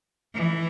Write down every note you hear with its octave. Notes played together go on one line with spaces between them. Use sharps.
E3